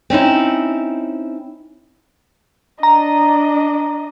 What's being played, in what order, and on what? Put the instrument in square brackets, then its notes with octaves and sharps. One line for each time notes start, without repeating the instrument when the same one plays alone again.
[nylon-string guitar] C4 C#4 D#4 E4
[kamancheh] D4 D#5 [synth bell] A#5